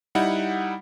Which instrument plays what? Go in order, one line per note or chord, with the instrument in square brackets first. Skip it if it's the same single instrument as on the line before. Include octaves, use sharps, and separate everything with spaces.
[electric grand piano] G3 D#4 E4 F#5